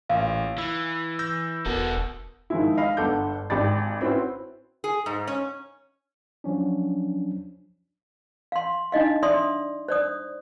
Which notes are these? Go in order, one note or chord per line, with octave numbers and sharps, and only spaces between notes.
A1 A#2 F5
E3 E6
E6 G6 A#6
E1 B3 F#4 A4 A#4
D#3 F3 G#3 D#4 E4
D#5 F5 B5
G1 G2 A4 F#5 D6 G6
G#1 G4 D5 B5 A6
C4 C#4 E4 F#4 B4 C5
G#4
G#2
C#4
F3 F#3 C#4 D4
F5 C6
D4 D#4 D#5 F5
D5 E5 C6 D#6
C5 D5 D#6